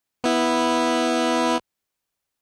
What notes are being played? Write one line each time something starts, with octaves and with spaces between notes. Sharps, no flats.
B3 E4